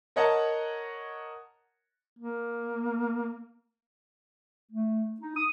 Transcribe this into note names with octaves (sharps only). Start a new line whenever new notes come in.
A#4 C#5 D#5 F#5 A5 A#5
A#3
A3
D#4
D#6